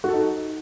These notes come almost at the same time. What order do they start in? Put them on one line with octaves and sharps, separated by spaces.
F#4 A4 D#4